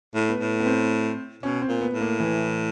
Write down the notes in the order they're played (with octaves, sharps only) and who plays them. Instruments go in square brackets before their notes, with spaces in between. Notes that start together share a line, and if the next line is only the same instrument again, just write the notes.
[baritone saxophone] A2
[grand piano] B3
[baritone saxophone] A2
[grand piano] B3
C4
[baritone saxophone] B2 [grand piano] C#4
[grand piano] C4
[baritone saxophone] A#2
[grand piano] B3
[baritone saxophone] A2
[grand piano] A#3
E3